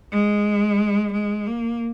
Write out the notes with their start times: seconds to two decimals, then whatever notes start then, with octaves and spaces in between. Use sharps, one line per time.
0.12 G#3
1.13 G#3
1.47 A#3